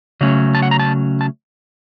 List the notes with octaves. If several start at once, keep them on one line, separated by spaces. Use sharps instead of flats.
C#3 F#3 A3 C#4
A5
F#5
A#5
A5
A5